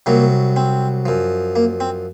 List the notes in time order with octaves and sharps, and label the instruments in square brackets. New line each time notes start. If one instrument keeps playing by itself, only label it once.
[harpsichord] C2 C3 F#3 A#3
C4
F#2 F3
A#3
C4